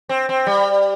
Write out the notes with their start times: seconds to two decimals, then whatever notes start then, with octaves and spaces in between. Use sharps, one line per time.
0.09 C4
0.29 C4
0.47 G3